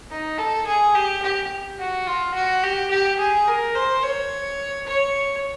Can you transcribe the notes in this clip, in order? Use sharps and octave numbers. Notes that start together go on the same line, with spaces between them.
D#4
A4
G#4
G4
G4
F#4
F4
F#4
G4
G4
G#4
A#4
C5
C#5
C#5